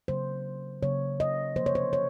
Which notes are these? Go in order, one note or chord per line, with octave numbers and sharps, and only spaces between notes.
C#3 F#3 A#3 C5
C#3 F#3 A#3 C#5
D#5
C3 F3 A#3 C5
C#5
C5
C#5